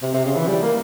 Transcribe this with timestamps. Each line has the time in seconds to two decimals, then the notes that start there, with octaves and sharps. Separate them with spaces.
0.03 C3
0.14 C3
0.26 C#3
0.36 E3
0.48 G3
0.62 A#3